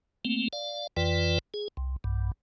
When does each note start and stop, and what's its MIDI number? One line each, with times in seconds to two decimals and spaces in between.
0.25 0.48 57
0.25 0.48 58
0.25 0.48 60
0.53 0.87 74
0.53 0.87 77
0.97 1.39 41
0.97 1.39 52
0.97 1.39 65
0.97 1.39 71
0.97 1.39 74
0.97 1.39 79
1.54 1.68 68
1.77 1.96 36
2.04 2.32 35
2.04 2.32 43